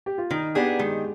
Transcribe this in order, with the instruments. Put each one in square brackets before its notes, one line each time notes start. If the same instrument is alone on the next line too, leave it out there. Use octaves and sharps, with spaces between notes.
[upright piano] G4
F4
[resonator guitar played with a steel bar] D#3 [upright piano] D#4
[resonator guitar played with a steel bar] B3 D4 G#4 [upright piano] G4
[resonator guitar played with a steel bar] D#3 [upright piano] G#3